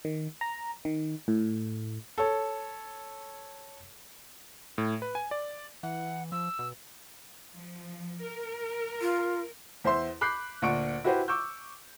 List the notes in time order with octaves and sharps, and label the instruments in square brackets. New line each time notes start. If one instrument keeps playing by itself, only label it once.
[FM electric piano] D#3
A#5
D#3
A2
[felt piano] A4 C#5
[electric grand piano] A2
B4
G#5
D5
[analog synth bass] E3 [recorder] F#5
[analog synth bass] F3 [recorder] E6
[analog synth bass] B2
[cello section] F3
A#4
[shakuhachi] F4
[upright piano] E2 C5 E5 C6
B5 D6 F#6 G6 C7
D2 A#2 D4 F#5 C#6 D7
E4 F#4 G4 B4 C5
C#6 D6 E6 G6